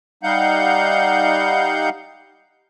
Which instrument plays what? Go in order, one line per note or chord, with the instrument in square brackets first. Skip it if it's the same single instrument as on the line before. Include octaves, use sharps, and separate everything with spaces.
[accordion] G3 D#4 F5 F#5 G6